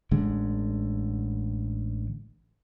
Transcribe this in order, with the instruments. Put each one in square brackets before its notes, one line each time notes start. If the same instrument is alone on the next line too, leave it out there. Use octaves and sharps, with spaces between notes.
[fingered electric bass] A1 D3 G#3